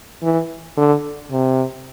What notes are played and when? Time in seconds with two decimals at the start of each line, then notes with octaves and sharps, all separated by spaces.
0.23 E3
0.77 D3
1.32 C3